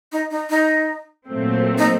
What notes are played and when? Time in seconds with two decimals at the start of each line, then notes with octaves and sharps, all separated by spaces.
0.12 D#4
0.31 D#4
0.50 D#4
1.27 A#2 F#3 A3 C4
1.78 D#4